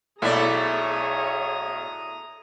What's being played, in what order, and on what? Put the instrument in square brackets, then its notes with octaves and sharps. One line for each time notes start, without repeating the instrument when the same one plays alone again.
[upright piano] B1 [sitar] A3 E4 D5 [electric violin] G#4 C#5 [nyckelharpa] A#5 D#6